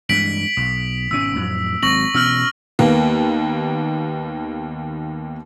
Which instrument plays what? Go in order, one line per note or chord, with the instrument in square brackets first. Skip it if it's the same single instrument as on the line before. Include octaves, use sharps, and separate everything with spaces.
[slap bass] G2 E3 G#3 [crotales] B6 D7 F#7
[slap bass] B1 [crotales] D#6
[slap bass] G#1 B2 C#4 [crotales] E6
[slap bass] F2 A2 F#3
[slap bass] G#1 F#3 C4 [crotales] C#6 A#6 F#7
[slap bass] B2 E3 C#4 [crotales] E6 F6 F#7
[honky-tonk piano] D#2 A#3 B3